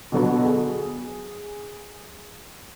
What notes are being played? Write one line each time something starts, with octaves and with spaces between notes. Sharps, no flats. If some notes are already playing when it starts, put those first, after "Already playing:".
B2 D3 F#3 B3
G#4